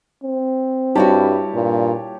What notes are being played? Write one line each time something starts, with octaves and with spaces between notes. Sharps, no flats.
C4
G2 G3 E4 F#4 G4 C#5 A5
G2 A#2